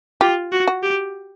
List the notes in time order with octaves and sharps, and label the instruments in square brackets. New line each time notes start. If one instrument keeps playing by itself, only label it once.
[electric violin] F4 [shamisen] G4
[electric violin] F#4
[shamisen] F#4
[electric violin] G4